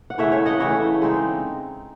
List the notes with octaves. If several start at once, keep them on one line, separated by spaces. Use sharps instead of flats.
F#5
C#3 E3 A3 C#5 E5
C#5 E5
D#5 F#5
C#3 E3 A3 C#5 E5
C#3 G#3 C4 D#4